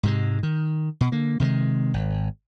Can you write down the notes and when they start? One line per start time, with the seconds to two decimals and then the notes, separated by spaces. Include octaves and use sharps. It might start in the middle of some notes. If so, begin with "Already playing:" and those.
0.03 G#2 C3 G#3
0.43 D#3
1.01 B2
1.12 D3 A#3
1.40 C3 D#3 F#3 G#3
1.94 G#1